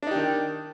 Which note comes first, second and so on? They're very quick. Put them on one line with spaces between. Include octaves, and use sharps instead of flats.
D4 D#4 G4 D#3